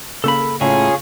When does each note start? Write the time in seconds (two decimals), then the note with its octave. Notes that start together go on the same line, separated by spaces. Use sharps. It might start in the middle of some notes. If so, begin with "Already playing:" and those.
0.24 C#3 A#3 A4 B5
0.61 A2 C#3 C#4 F4 G#4 C#5